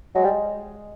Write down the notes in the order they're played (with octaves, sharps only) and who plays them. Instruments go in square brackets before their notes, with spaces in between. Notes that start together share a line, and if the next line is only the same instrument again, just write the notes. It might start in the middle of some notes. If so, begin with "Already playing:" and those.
[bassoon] F#3 [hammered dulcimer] G#3
[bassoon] G3